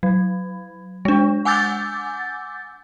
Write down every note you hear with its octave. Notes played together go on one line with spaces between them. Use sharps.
F#3
G#3 D4
F#5 G#5 D6 E6 G6 A6